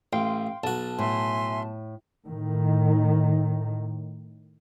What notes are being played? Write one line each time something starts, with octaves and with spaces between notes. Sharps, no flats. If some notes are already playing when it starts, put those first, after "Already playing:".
A1 F5 G5 C6
B1 F#4 A5
A2 E5 G#5 C6
A2 D#3